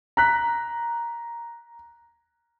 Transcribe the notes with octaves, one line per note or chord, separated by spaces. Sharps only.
A#5 F#6 B6